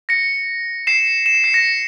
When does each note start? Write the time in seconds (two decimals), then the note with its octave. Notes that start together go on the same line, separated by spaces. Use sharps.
0.09 A#6 C#7
0.87 C7 E7
1.26 E7
1.34 C#7
1.44 C7
1.53 A#6 C#7